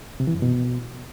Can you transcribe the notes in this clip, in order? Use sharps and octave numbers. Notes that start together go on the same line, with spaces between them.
C3
E3
F#2
B2